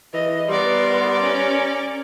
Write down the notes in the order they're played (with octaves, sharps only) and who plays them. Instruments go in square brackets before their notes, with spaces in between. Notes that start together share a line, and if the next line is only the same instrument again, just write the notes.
[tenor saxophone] E3 [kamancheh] D#5
[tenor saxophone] G3 [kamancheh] B3 C6 [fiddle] A#4 D5
[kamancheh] C#4